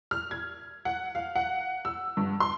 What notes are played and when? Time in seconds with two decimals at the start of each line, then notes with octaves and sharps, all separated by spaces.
0.11 F6
0.31 G#6
0.85 F#5
1.15 F5
1.36 F#5
1.85 E6
2.17 G2
2.40 C6